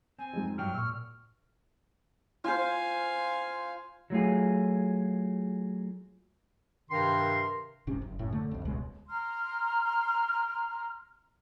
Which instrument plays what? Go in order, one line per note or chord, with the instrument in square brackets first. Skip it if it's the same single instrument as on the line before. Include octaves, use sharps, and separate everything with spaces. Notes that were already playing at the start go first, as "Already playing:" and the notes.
[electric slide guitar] C4 [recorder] G#5
[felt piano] F2 G#2
[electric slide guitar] G2 F#3 G5 [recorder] F6
[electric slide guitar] A#2 [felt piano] C#6 E6
[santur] F4 C5 [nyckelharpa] F5 G#5
[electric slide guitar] F#3 A3 F4 G#4
[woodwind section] G2 C3 D#3 A#4 C6
[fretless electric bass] F#1 G#2 C3 C#4
F#1
F#2 A2
D3 A3
B1 F2
D#1 C#2 B2 G#3
[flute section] A#5 C6 F6